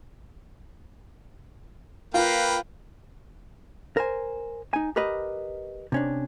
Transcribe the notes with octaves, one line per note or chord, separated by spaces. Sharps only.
A#3 F4 B4 G5
A#4 C5 G#5
D#4 G#5
G4 A#4 B4 D#5
C3 C#4 D4